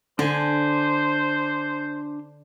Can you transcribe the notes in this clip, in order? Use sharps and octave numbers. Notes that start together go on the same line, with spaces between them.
D3 D4 C5 G#5